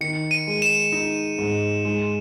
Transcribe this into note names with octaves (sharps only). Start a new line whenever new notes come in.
D#3 C#7
D#7
G#3
E7
D#4
G#2
G#3